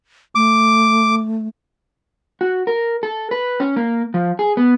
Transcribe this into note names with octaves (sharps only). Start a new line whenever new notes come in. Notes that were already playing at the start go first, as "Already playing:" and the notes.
A3 D6
F#4
A#4
A4
B4
C#4
A#3
F3
G#4
B3